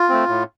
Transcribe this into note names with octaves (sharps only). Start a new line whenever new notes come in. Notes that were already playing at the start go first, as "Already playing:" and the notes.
Already playing: F4
A3 C4
A2